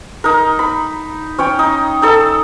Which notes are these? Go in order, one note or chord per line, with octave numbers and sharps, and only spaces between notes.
D#4 A#4
B5
C#4 C#5 G5
D#4
D#4 A4 E6